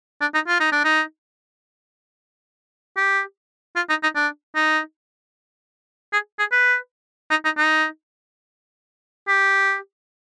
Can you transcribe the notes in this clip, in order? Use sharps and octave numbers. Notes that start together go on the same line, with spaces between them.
D4
D#4
F4
D#4
D4
D#4
G4
F4
D#4
D#4
D4
D#4
G#4
G#4
B4
D#4
D#4
D#4
G4